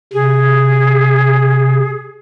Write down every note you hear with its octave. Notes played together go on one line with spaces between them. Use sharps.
C3 G#4